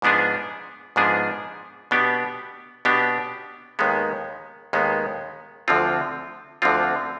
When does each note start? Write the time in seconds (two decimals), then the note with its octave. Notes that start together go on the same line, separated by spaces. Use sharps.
0.02 G#2 F3 B3 D4 G#4
0.96 G#2 F3 B3 D4 G#4
1.91 B2 B3 D4 G4
2.85 B2 B3 D4 G4
3.79 D#2 D#3 G#3 B3
4.73 D#2 D#3 G#3 B3
5.68 D2 D3 F3 C4 F4
6.62 D2 D3 F3 C4 F4